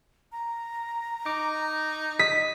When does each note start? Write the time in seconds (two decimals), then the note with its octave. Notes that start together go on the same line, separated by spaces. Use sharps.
0.32 A#5
1.26 D#4 D6
2.19 D#5 D#6 B6